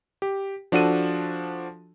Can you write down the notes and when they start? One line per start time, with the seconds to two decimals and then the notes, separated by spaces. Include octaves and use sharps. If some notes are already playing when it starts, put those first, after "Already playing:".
0.22 G4
0.72 F3 D4 F#4 A4 D#7